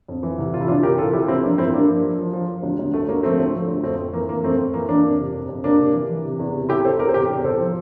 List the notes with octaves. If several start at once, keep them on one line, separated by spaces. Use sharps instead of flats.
F2
E3
C2
C3 F4
E4
E3 D4 F4
C3 G4 A#4
C2 F4 A4
E3 E4 G4
E3 C4 E4
F3 A#3 D4
G2 C4 E4
G2 A#3 D4
F3
F3
F3
F3
F3
D2
D2
D2 A3
D2 A#3
F3 A3 C4
D2
F3
D2
F2 A3 C4
F2
E3 A#3
F2 A#3
F2 A3 C4
F2
E3 A#3
E3 A#3 D4
F2
C3
F2
F2
C3 A#3 D4
C3
E3
E3
C3
E2
C3
C3 E4 G4
E2 A4 C5
E2 G4 A#4
C5
C3 G4 A#4
E2
C2 A4 C5
F3